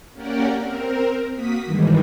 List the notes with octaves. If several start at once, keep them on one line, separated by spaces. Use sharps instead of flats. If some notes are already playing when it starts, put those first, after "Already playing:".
A#3 C#4 G4 A#4 D5 F#5
C4 A#4
A#3 F#4 D#6 B6
G2 D#3 E3 G3 G#3